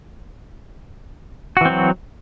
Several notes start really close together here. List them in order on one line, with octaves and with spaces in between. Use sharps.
F#4 E3 C4 F#3